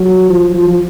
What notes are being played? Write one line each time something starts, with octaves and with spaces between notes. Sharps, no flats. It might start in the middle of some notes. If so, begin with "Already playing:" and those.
Already playing: F#3
F3
F3
F3